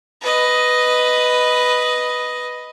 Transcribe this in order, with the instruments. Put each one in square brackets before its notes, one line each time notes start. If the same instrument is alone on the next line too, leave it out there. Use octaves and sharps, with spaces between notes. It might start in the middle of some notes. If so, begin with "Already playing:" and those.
[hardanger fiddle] B4 D#5